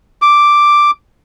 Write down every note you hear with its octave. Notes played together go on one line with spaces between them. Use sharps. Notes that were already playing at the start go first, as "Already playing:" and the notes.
D6